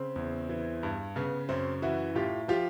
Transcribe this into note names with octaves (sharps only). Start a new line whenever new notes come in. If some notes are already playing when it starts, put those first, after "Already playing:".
Already playing: C#3 C4
E2
E3
G2
C#3 B3
F#2 C4
E3 E4 F#4
A2 F4 G4
F3 F4 G4